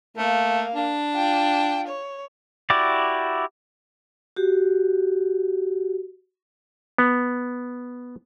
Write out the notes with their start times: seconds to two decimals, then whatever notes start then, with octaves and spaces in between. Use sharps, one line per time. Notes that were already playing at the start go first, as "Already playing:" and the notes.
0.17 A3 A#3 F5
0.75 D4
1.15 F4 G5
1.88 C#5
2.70 E4 F#4 G4 D5
4.36 F#4 G4
6.98 B3